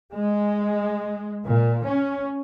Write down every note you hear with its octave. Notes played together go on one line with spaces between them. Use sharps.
G#3
A#2
C#4